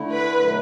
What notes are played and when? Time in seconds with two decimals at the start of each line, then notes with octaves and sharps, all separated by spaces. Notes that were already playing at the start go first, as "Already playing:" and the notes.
Already playing: D3 A3 E4
0.12 B4
0.42 B2 F#3 A3